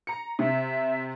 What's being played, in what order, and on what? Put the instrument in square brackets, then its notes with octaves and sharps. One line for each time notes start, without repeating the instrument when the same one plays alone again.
[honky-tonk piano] A#5 C#7
[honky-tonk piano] C3 [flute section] E5